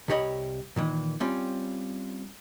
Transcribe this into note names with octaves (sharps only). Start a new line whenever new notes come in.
C2 C3 G4 C#5 D#5 B5
A#2 D#3 E3
G3 C4 C#4 F4